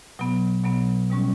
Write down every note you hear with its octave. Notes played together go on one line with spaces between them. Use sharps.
B2 F#3 B3
B2 F#3 B3
B2 G3 C#4